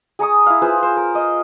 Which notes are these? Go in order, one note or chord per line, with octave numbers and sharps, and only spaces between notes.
G#4 A#5 C#6 D#6
E4 F5
F4 G#4 B4 C5
C5
A#4
D#5